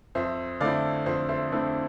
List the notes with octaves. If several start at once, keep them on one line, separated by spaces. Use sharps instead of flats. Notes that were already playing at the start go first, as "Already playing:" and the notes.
F2 C5 E5
D3 A3 C4 E4 D5 F5
F2 C5 E5
C5 E5
D3 A3 C4 E4